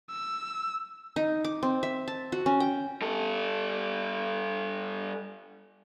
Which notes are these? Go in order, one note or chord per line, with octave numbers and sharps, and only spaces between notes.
E6
D#4
D6
C4
E5
A5
F#4
C#4
G5
G3 A4